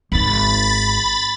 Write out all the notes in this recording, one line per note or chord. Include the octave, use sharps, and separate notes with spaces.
G#1 D#3 B5 A6